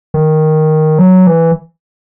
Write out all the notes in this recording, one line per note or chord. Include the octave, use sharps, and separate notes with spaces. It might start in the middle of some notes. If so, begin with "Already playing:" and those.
D#3
F#3
E3